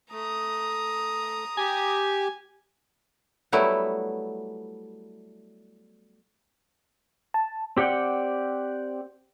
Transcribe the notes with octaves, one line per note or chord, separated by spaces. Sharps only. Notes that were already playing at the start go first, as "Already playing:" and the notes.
A3 A#5 D#6
G4 G#5
F#3 G3 A3 B3 E4
A5
C4 G4 D5 F#5 G5